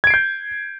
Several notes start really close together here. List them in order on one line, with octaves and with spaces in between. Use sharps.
G#6 D7 C7 G6